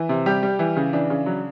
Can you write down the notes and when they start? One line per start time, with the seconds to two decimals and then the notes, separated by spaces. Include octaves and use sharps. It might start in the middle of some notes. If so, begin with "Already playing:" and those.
Already playing: E3
0.09 C3
0.26 G3 G4
0.43 G3
0.59 E3
0.77 C#3
0.93 E3 D4
1.10 C#3
1.26 F#3